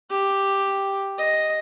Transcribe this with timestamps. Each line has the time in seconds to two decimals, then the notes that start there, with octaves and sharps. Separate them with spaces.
0.10 G4
1.18 D#5